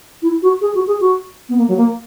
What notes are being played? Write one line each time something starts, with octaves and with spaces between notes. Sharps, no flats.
E4
F#4
G#4
F#4
G#4
F#4
B3
A#3
F#3
A#3